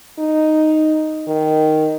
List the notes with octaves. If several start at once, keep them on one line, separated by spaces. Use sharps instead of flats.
D#4
D#3